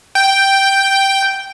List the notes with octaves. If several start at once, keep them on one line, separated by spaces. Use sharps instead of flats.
G5